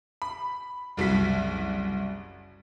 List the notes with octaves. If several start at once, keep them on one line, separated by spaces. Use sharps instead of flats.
B5
F#1 C2 F#4 B6